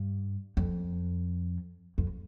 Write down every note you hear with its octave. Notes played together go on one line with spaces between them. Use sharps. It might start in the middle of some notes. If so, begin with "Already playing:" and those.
Already playing: G2
F2
F2